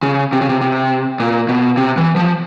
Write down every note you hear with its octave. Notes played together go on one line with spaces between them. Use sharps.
C#3
C3
C#3
C3
C3
A#2
B2
C3
E3
F3